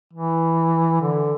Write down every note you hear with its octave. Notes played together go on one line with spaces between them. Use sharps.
E3
D3